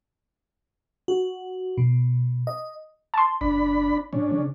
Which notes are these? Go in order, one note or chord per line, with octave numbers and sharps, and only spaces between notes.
F#4
B2
D#5
A5 C6
F#1 D4 B5
A2 C#4 D4
C#3